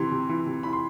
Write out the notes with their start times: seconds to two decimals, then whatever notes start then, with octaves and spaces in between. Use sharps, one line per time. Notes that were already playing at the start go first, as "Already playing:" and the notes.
Already playing: C3 E3 C6
0.11 C3
0.29 E3
0.46 C3
0.63 E3 B5
0.73 C6